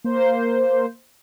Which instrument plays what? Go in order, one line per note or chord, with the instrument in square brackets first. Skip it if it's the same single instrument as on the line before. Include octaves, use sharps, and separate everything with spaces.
[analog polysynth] A#3 C5